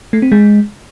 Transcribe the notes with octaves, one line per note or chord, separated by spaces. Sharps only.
A3
C4
G#3